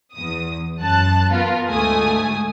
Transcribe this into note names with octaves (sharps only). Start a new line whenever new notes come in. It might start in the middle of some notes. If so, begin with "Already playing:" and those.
E2 D#6
F#2 A5 F#6
B3 F4 A#4
D2 G#2 A3 G#5 D#6